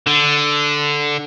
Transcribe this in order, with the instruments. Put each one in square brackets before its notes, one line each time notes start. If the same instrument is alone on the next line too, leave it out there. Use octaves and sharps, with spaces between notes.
[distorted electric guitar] D3